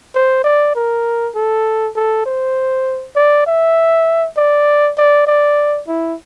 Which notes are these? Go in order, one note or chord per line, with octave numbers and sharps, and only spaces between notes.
C5
D5
A#4
A4
A4
C5
D5
E5
D5
D5
D5
E4